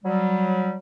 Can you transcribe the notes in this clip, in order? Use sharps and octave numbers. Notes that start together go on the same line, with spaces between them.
F#3 G3